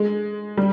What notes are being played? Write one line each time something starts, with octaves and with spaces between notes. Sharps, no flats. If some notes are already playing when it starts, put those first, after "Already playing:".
Already playing: G#3
G3